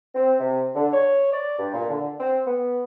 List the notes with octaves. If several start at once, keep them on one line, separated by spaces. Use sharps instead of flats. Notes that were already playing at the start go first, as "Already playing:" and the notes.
C4
C3
D3
C#5
D5
G2
A#2
D3
C4
B3